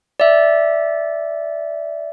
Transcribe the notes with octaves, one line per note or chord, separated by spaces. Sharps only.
D5 E5